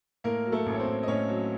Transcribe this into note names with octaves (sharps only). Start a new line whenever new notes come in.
A2 A#3 A#4
F#3
A3 A4
A1
C#5
C4 C5
A1
D#5
A2 C#4 C#5
F#3